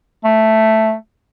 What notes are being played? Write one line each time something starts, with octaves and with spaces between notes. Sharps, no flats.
A3